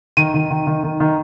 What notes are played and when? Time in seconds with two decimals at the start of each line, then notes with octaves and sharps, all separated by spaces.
0.17 D#3 D#7
0.34 D#3
0.50 D#3
0.67 D#3
0.83 D#3
1.00 D#3